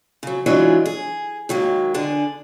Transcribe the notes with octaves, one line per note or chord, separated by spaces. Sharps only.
C#3 F#3
E3 F#3 G#3 C#4 D4 F4
G#4
D#3 F#3 G#3 A#3
D3 D4 G#4